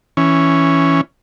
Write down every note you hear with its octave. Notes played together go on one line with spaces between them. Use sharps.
E3 C#4